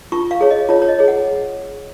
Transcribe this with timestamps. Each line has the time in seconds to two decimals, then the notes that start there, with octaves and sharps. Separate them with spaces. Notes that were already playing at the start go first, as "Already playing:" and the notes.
0.12 F4 C#6
0.31 F5
0.41 G#4 C#5
0.51 D#5
0.69 F4 C#5
0.82 C#5
0.88 D#5
0.98 G#4 C#5
1.08 F#5